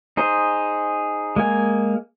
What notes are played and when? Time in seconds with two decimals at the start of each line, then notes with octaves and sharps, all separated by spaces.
0.17 D#4 G#4 C5
1.36 G#3 A#3 G#5